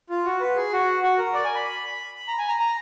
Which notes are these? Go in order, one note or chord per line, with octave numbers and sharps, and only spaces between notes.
F4
F#4
B4
G#4
F#4
F#4
A#4
D5
G#5
B5
A#5
G#5
A#5
A#5